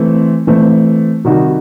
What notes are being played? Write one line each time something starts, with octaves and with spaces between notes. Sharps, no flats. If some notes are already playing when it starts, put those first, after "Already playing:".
Already playing: E3 A3 C4
E3 A3 C4
C3 D#3 G3 D#4 F#4